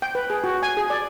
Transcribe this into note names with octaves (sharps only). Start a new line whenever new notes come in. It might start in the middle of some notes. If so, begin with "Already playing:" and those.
G5
B4
G#4
F#4
G#5
G#4
D5